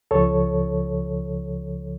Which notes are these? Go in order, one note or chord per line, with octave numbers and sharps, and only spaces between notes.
C#2 C#3 F3 A4 C#5